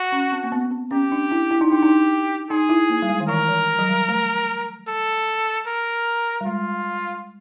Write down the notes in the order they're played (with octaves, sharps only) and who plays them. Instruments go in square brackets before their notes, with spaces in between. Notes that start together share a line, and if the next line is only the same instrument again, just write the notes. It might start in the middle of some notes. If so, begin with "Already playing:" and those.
Already playing: [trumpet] F#4
[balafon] C#4
C4
A#3
B3
C4
[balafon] C#4 [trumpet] G4
[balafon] D4
E4
E4
D#4
[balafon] D4 [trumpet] G4
[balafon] D#4
[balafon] D#4 [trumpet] G#4
[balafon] E4
A#3
G3
G#3
D#3
[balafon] E3 [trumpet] A#4
[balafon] E3
F#3
G3
A3
[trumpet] A4
A#4
[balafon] G3
[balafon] G#3 [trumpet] F4